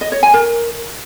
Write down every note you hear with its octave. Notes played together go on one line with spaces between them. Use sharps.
D#5
C#5
G#5
A#4